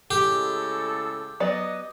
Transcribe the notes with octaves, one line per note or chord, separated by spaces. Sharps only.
A2 C#3 G#3 G4 A4
F#3 B3 D5 D#5